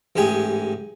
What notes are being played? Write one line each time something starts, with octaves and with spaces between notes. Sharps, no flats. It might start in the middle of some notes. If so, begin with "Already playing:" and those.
A1 G#2 G4 G#4 G#5